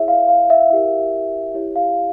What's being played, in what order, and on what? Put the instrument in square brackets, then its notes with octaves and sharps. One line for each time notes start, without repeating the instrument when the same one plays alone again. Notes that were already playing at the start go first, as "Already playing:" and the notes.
Already playing: [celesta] E4 G#4 C#5 E5
F5
F5
E5
E4 G4 A#4
E4 G4 C#5
F5